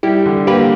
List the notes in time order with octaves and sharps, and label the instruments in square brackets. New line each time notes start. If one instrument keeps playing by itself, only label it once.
[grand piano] G3 [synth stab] E4 G4
[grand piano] D3
[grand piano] A#3 [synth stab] G4 B4